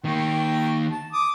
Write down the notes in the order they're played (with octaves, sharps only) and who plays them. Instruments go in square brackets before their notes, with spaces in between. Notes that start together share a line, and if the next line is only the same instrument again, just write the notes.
[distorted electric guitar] D#3 A#3 [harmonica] G5 C#6
[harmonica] A5
D6 D#6